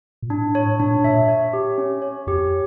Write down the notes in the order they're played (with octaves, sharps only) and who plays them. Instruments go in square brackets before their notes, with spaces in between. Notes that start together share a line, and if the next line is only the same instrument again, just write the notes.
[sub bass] A#2
[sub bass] A2 [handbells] D4
[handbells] C#5
[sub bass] A#2 [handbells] D4
[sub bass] A#2 [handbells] E5
[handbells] C#5
G4
C#4
C#5
[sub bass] F2 [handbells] G4